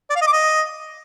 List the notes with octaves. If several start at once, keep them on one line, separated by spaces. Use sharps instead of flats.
D5
F5
D#5
D6
D#5